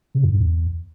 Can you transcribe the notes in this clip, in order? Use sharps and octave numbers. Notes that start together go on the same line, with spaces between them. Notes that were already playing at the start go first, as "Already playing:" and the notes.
C#3
F#2
G2
E2